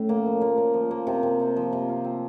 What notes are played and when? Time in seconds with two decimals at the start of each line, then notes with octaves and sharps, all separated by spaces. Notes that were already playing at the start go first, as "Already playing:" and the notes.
Already playing: A2 A3 C#4
0.09 A#3
0.26 F3
0.41 A#3
0.58 A#3
0.74 F3
0.91 A#3
1.07 C3
1.23 C3
1.40 C3
1.56 F3
1.73 C3
1.89 F4
2.04 C4